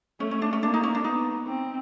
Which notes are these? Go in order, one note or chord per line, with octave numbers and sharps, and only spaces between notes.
A3 C#4
C#4
D4
C#4
A#3 D4
D#4
C#4
D4
B3 D#4
C4